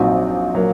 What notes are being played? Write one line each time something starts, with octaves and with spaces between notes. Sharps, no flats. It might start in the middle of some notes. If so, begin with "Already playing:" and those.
Already playing: A#1 A#2 F#3 C4 D#4 F#4
F#3 A#3